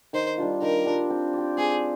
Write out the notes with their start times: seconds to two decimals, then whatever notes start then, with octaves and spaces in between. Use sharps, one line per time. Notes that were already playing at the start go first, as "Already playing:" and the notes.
0.13 D#3 C5
0.38 G3 D4 F4
0.62 D#3 A#4
0.86 G3 D4 F4
1.10 C4
1.33 G4 D5
1.57 C4 G#4